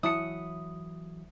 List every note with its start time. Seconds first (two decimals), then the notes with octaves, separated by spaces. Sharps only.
0.03 E3 F#3 E4 A5 D#6 C#7